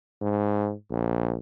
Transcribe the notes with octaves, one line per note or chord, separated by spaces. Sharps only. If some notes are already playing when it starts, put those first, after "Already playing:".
G#2
A#1